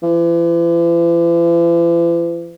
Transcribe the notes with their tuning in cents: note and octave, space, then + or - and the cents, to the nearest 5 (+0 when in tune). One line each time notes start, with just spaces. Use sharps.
E3 +45